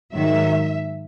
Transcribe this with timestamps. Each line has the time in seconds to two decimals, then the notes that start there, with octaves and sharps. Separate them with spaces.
0.12 G#2 D#3 F#3 E5